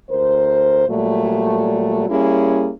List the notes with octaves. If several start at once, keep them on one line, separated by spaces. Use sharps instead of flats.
D2 A#4 C5
A#2 F#3 G3 A3
G3 A#3 C#4 E4 G#4